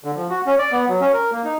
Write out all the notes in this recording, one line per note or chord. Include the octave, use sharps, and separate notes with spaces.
D3
F3
F#4
C#4
D5
B3
F#3
C#4
A#4
A#3
D#4